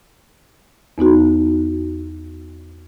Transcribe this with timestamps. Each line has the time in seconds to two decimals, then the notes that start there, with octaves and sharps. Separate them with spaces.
0.98 E2 B3 D#4 F#4